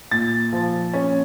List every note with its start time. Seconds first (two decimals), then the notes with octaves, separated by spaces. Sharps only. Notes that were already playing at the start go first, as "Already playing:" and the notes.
0.11 A#2 A6
0.53 F3
0.93 C#4